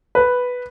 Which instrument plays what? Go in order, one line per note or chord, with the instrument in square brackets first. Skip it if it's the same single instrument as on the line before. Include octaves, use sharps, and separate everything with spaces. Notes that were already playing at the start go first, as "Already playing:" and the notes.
[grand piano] B4